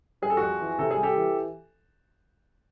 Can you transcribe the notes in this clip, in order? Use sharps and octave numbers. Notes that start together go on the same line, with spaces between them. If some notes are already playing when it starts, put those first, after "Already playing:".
G3 G#4
A4
F2 F#4 G#4
E3
C3 A4
G#4
G3
G4 A4
E3